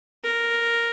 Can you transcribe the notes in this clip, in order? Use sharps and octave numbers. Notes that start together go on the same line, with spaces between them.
A#4